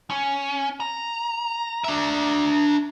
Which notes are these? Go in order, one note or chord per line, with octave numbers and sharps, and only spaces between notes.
C#4
A#5
D4 E5